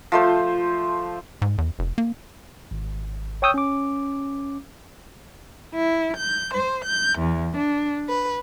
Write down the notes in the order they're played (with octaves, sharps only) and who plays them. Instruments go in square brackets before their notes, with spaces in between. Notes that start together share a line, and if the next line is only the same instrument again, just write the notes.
[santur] F3 A3 C5
[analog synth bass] G#2
E2
F1
A#3
[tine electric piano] G#1
C#5 G5 C#6 D#6 E6 G6
C#4 D6
[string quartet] E4
G6
C5
G6
E2
D4
B4